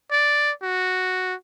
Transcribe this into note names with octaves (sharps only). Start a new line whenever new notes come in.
D5
F#4